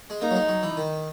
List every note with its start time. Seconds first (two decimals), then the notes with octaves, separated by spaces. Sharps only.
0.10 G#3
0.21 A#3 D#4
0.31 F#3
0.35 G#3
0.48 F#3
0.63 E3
0.77 D#3